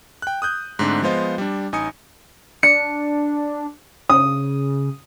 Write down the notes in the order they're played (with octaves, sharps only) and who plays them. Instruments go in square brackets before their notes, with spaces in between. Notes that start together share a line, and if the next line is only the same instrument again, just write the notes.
[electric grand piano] G5 F#6
D#6 F#6 G6
G#2 D3 A3 C4 D4
F3 G#3 B3 F4 C5 D#5
G3 D4
A1 D#4 G#5 D#6 C#7
[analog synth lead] D4 [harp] C#7
[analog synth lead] C#3 [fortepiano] D#6